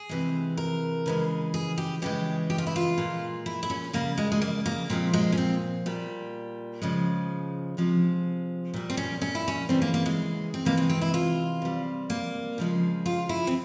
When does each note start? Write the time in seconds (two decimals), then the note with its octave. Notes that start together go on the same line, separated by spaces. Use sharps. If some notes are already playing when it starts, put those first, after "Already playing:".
Already playing: G#4
0.09 C3 E3 G#3
0.57 A#4
1.06 C#3 E3 G#3
1.54 G#4
1.78 G4
2.02 C#3 E3 G#3 G4
2.50 G4
2.58 F4
2.67 E4
2.76 F4
2.98 A#2 G#3
3.46 E4
3.63 E4
3.70 C#4
3.93 C#3 G3 A#3
4.18 G#3
4.32 G#3
4.42 A#3
4.66 A#3
4.90 A#2 F3 G#3 C4
5.14 G#3
5.32 C#4
5.38 C4
5.86 A#2 G3
6.82 C#3 F3 G#3
7.77 C3 F3 G#3
8.74 A#2 G3
8.90 C4
8.97 C#4
9.22 C#4
9.35 E4
9.48 C#4
9.69 C#3 E3 G3 C4
9.82 A#3
9.94 A#3
10.06 G#3
10.54 C4
10.65 C3 E3 G#3 A#3
10.78 C4
10.90 C4
11.01 E4
11.14 F4
11.62 C3 G3
12.10 A#3
12.58 C#3 F3 G#3
13.06 F4
13.29 E4
13.47 C4